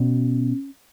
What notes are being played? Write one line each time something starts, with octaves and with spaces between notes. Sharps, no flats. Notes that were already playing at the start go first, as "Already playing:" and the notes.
Already playing: B2 C#4